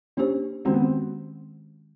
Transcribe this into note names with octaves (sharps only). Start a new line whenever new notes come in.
A#3 C#4 D4 G4 C5
D#3 G#3 C4 C#4 F#4
B3
C4